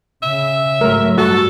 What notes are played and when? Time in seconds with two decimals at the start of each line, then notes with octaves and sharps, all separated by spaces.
0.23 C#3 E5
0.81 G#2 F#3 A3 A#4
1.18 G2 G3 F#4 A4